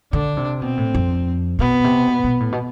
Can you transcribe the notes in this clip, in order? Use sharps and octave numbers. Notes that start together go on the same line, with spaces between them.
D3 D4
C3
B2 C4
A2
F2
B2 B3
C3
B2
B2
A2
B2